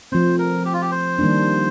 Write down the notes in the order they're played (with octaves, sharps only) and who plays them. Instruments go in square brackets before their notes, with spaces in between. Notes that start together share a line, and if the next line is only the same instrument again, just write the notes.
[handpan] F3 A3 C4 [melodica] C5
[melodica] A#4
G4
F4
G4
C5
[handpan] D#3 G3 A#3 D4